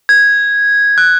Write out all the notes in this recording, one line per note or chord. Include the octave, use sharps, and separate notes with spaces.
G#6
F#6